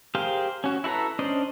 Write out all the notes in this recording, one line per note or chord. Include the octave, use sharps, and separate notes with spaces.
G4 G#4 A#4 C5 F5
C#4 F#4
E4 F#4 A4 B4 A#5
C#4 D4 C5 D5 D#5